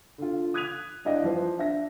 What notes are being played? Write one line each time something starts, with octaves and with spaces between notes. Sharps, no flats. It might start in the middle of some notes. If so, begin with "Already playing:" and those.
D3 F4
D#6 F#6 G#6 B6 D#7 F7
D4 E4 D5 D#5 F5
E3 F3 C5
D4 E5 A#6